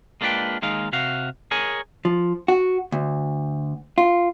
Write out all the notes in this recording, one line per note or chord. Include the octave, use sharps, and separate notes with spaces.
G#3 A#3 D4 F4 B4 G5
D#2 G#3 D#4 F5
C3 F#4 F5
G#4 A#4 C#5 G#5
F3
F#4
D2
F4